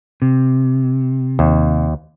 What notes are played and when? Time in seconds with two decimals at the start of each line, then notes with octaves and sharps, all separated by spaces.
0.22 C3
1.39 D#2